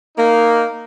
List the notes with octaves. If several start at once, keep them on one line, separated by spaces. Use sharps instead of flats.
A#3 D#4